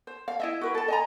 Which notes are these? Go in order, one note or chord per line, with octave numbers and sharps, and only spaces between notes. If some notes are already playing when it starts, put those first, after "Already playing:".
C5
F5
E4 D#5 E5
F#4 A#4 B4
A4 A5
D#5 G#5 A#5